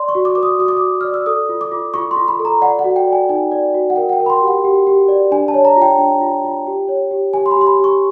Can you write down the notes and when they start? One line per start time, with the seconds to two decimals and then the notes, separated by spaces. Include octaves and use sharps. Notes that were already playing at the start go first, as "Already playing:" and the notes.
Already playing: D5 C6
0.09 C#6
0.15 F#4
0.25 D6
0.35 B4 D6
0.43 D#6
0.59 F#4 D#6
0.68 D6
0.77 F#4 D#6
1.01 D5 F6
1.14 E6
1.26 A4 D#6
1.49 F4
1.61 D6
1.71 F4
1.94 F4 C#6
2.11 C6
2.17 F4
2.28 B5
2.39 A4
2.45 A#5
2.61 D5 F#5
2.79 F#5
2.84 F#4
2.96 G5
3.07 D5
3.13 G#5
3.29 D#4 G#5
3.52 D5
3.74 F#4
3.90 F#5
3.96 A#4 G5
4.09 F#5
4.13 G5
4.20 A#4
4.26 B5
4.30 C6
4.42 G4
4.47 F#5
4.64 G4
4.87 G4
5.08 D5
5.31 D4 G#5
5.48 A5
5.54 C#5
5.65 A#5
5.76 F4
5.82 G5
5.98 D4
6.21 F4
6.44 F4
6.67 G4
6.88 C#5
7.11 G4
7.33 G4 G#5
7.46 C6
7.51 B5
7.56 G4 C6
7.67 B5
7.79 G4 C#6